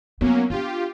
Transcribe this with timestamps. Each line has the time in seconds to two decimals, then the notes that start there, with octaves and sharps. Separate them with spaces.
0.21 F#3 A#3 B3 C#4 D#4
0.50 D4 F4 G4